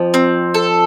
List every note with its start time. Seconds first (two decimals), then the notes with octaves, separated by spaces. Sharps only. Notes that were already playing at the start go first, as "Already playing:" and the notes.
Already playing: F2 F3
0.14 C4
0.54 A4